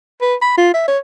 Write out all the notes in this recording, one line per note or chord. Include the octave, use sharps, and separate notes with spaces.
B4
B5
F4
E5
C#5